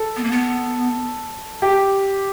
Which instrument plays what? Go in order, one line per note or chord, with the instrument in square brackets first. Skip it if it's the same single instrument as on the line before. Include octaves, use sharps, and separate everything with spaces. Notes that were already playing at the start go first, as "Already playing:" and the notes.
Already playing: [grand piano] A4
[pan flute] B3
A#3
B3
[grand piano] G4